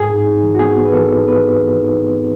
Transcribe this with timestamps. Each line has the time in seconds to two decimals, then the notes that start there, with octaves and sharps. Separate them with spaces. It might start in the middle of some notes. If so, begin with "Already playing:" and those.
Already playing: G#2 G#4
0.10 D#4
0.27 D#4
0.43 E3
0.55 F#4
0.59 B3 G#4
0.76 B3
0.85 B4
0.93 E3 A4
1.10 D#4
1.27 B3 B4
1.45 D#4
1.61 E3
1.78 D#4
1.94 E3
2.12 B3